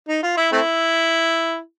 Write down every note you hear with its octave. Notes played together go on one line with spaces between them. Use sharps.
D#4
F4
E4
A3 C4 E4